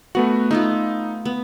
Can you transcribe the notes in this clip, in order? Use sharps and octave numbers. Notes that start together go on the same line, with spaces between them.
A3 B3 F#4 F#5
A3 B3 D#4 F4
B3